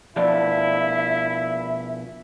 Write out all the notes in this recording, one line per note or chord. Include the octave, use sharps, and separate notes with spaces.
B2 F3 E4 D5 E5